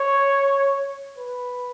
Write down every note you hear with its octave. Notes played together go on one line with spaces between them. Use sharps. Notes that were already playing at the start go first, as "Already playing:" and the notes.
Already playing: C#5
B4